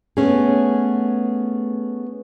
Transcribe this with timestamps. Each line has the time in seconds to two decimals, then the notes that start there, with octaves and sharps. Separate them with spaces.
0.17 A3 B3 C#4 G#4